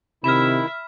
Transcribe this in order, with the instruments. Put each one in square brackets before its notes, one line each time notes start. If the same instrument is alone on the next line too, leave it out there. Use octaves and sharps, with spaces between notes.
[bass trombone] C3 [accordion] D#3 E4 [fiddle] E5 [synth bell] B5 F6